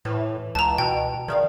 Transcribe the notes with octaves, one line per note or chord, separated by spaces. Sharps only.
A2 E3
C#2 A5 A#5
B2 G5
D#3 D5 E5 F5